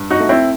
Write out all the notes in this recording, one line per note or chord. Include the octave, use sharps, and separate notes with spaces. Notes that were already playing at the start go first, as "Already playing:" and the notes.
Already playing: G2
D#4 F#4
A3
C4 E4